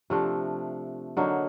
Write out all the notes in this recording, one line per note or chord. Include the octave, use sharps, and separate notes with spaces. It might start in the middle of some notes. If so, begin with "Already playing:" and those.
C3 F3 A3 D4
D3 F#3 A#3 D#4